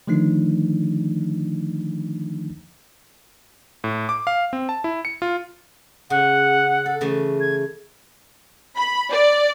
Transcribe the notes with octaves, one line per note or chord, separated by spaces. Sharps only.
D3 D#3 F3 A3 D4 D#4
A2
D6
F5
C4
A5
E4
C#7
F4
C#3 F#5
A4
C#3 E3 A3
G#6
B5
D5